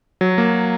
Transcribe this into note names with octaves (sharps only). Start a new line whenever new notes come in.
F#3
A#3